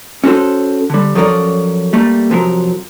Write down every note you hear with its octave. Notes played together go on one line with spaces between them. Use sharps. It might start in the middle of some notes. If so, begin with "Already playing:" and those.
C#4 F#4 A4 C5
D3 G3
F3 F#3 C#4 A4 A#4 D5
G3 A3 A#3
C3 F3 F#3 A#4